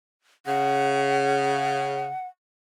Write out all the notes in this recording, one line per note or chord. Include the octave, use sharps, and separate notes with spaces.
C#3 F#5